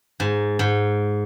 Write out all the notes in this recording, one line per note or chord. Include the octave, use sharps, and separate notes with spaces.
G#2
G#2